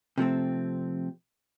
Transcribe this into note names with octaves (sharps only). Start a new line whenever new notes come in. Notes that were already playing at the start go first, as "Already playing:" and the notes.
C3 F3 A3 C4